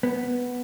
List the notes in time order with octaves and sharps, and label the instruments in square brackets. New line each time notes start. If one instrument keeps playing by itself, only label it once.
[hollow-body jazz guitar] B3